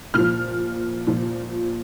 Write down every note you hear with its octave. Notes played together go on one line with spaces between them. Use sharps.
A#2 F3 F6
A#2 F3